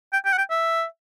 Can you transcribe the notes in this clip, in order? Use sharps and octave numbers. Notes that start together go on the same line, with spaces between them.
G5
G5
F#5
G5
E5